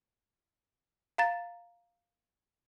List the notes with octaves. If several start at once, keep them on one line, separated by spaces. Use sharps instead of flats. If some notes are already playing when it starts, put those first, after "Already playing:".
F5 A#5 A6